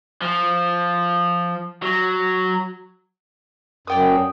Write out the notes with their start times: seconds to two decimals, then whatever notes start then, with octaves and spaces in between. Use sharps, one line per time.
0.21 F3
1.83 F#3
3.87 F#2 D5 G5 D#6